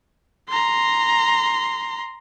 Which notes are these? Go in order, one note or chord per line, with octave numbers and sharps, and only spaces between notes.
A#5 C6